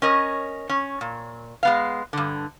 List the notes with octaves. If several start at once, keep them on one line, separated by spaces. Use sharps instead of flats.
C#4 A#4 D#5
C#4
A#2
G#3 B3 F5
G2 D3